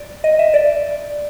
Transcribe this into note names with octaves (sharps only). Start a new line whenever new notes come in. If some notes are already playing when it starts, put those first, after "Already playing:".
Already playing: D5
D#5
E5
D5